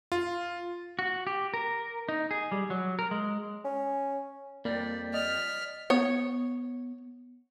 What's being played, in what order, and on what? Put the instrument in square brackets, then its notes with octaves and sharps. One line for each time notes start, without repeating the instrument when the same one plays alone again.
[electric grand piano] F4
[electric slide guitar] F#4
G4
A#4
D#4
G#4
G3
F#3
A#4
G#3
[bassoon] C#4
[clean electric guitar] F2 G3 [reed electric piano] A#3 [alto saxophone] D5
[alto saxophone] D5 [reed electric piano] D#5 [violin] F6 B6
[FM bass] B3 [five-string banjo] C#5